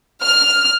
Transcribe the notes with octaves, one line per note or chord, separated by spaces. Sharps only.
F6